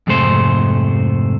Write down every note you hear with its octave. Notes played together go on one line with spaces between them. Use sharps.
F2 G#2 C3 A3 C5